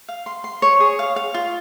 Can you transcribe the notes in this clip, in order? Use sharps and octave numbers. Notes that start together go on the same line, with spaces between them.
F5
C6
C6
C#5
G#4
F5
F5
F4